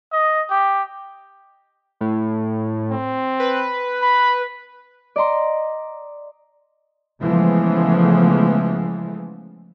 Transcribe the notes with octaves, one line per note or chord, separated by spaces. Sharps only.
D#5
G4
A2
C4
B4
B5
D5 D#5 A#5 C6
C#3 E3 F3 G#3 A3 B3